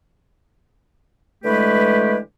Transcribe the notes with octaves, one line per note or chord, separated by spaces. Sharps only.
D3 E3 G#3 A3 G4 B4